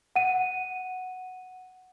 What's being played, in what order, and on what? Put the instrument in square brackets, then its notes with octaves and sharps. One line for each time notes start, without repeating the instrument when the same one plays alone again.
[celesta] F#5 D#7